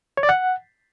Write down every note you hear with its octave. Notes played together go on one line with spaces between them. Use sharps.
C#5
D5
F#5